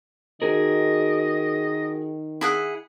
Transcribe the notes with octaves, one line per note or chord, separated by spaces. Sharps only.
D#3 F#4 G#4 A#4 D#5
E4 G#4 F#5